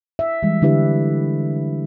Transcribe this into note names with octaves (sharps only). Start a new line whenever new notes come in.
E5
E3 G3 G#3
D3 D4 E4 G4 B4 E5